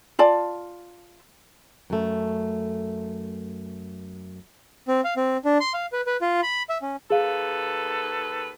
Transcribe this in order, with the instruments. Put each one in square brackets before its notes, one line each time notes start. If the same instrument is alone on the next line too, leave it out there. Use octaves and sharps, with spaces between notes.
[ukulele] F4 D5 A5
[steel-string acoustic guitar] F#2 A3
[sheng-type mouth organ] C4
F5
C4
D4
C6
F5
B4
B4
F4
B5
E5
C#4
[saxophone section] D#2 A4 B4 [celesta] G#4 F5